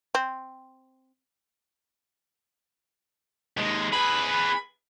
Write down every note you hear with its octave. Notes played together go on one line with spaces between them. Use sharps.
C4
D#2 G#3
G#4 B4 B5